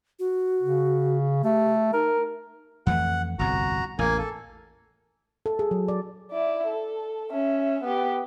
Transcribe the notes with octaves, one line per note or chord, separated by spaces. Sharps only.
F#4
C#3
A3 G4
D#4 A#4
F2 E3 A3 F#5
G1 C2 F2 F#4 A#5
A1 E2 A#3 G#5
A4
A4
G#4
F#3
D5
E4 D5
A4
C#4 E5
B3 G4